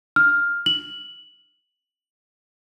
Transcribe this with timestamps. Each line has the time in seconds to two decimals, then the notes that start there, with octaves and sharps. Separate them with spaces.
0.16 F6
0.66 F#7